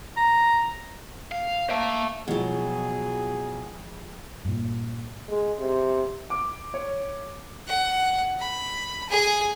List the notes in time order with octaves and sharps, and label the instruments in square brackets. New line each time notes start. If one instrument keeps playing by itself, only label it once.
[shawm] A#5
[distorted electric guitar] F5
[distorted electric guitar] A#3 [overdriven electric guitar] E5 A5
[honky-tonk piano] F2 E3 G#3 [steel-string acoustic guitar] B2 F#3 [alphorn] G#4
[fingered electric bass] G2 A#2
[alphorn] G#3
C3
[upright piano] D6
C#5
[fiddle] F#5
B5
G#4 G#5